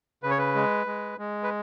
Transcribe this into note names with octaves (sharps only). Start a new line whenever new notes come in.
C#3 B4
C#5
B4
G#3
G#3
G#3
B4